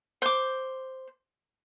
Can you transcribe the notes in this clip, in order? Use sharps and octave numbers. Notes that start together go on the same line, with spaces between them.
C5 D6